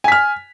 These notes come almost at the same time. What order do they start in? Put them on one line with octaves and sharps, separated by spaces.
G#5 B6 F6